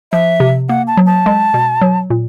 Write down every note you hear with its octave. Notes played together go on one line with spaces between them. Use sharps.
F3 E5
C3
A#3 F#5
A5
F#3
A5
G#3
B2
F#3
A#2